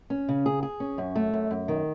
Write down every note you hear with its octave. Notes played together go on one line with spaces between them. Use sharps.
C#4
C#3
G#4
G#4
C#4
F#2
A3
F#2
F#2
D#3